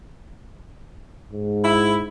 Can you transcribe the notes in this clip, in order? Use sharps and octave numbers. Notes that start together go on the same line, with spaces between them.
G#2
E4